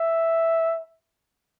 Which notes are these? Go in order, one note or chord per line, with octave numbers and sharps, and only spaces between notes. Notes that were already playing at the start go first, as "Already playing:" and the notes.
Already playing: E5